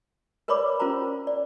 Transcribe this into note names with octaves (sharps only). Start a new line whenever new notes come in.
A#4 B4 C#5 D5 B5 D6
C#4 F4 A#4 C5 A#5
D5